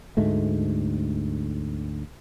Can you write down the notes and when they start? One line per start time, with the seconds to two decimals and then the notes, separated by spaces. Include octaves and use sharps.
0.17 D2 G#2 G#3 A3